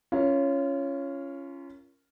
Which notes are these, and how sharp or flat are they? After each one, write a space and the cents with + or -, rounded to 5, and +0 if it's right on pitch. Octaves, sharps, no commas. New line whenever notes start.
C#4 +0 F4 -30 A#4 +0